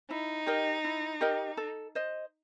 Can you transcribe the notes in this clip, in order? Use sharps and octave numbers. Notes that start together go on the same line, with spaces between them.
D#4 E4
G4 A#4 D#5
E4
G4 A#4 D#5
A4
C5 D#5